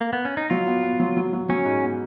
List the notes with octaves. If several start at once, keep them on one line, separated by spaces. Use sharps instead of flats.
A#3
B3
C#4
D#4
F#3 F4
B3
B3
F#3
F#3
F#3
F#3 C#4
G#2
B3